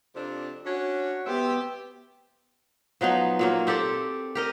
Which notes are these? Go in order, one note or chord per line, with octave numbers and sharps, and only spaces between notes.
F2 C3 D4
C#4 D4 F#4 C#5
B3 G4 C5 E5
F3 F#3 B3 D#4
A#2 F#3 A#3
C4 G4 A4 D5
G4 A#4 D#5